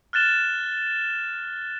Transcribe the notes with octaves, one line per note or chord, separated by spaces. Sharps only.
F6 F#6 A6 E7 G7